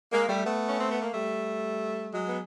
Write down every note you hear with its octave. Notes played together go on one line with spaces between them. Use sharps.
G#3 A#3
G3 A3
A3 B3
C#4
C4
B3
A#3
G3 A3
F#3 G#3
B3